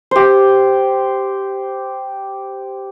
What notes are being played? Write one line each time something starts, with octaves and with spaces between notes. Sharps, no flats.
G4 C5